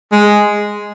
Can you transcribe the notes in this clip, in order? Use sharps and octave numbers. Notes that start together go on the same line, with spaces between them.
G#3